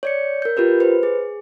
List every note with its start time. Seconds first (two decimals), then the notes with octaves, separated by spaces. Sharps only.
0.03 C#5 D5 C#7
0.42 A#4 G6
0.57 F4 G4 A#4 B4
0.80 B4 C5
1.03 G#4